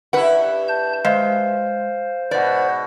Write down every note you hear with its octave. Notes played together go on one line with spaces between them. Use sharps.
G2 E4 B4 F#5
A5 G6
G#3 C5 F5
G#2 B2 B4 D5 F#5